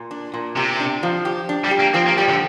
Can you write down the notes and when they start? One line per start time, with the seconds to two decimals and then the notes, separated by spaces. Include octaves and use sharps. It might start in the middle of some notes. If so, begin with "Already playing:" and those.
Already playing: A#2
0.11 D4
0.34 A#2
0.56 C3 G4
0.80 D4
1.03 F3
1.25 G4
1.49 D4
1.65 G3
1.71 G4
1.80 A#3
1.94 F3 C4
2.07 A#3
2.18 G3 G4
2.29 D3